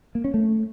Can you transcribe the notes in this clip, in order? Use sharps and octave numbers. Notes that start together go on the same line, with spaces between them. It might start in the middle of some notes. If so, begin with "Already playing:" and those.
A#3
C#4
A3